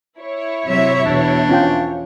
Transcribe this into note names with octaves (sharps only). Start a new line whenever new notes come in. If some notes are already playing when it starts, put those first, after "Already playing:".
E4 C#5
C3 F#3 E5
E2 B2 D4
C#4 F4 G5